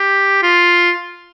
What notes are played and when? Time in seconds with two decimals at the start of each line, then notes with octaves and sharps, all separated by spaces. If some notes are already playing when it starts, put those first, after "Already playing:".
Already playing: G4
0.43 F4